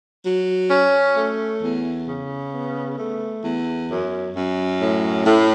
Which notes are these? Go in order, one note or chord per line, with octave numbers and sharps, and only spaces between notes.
F#3
C#4
A3
E2
C#3
B3
A3
E2
F#2
F#2
A2
A2